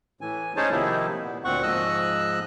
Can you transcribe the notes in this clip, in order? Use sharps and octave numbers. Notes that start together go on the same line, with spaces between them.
A2 E3 G#5
C#4 D#4 G#4 C5 C#5 A5
C3 D#3 F3 A#3 D#4 E4
A#2 B3
D2 A#2 C4 F#5 C#6
G#2 F3 D#5 E6 F#6